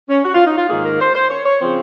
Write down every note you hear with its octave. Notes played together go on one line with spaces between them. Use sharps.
C#4
F#4
F4
D#4
F4
G#2 D#3 A#3 G#4
A#4
C5
C5
C#5
C#5
C#3 F3 C4 C5